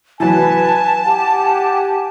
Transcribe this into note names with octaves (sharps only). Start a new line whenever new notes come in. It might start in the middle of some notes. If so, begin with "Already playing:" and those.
E3 F#3 B4 G#5 A5
G4 F#5 G#5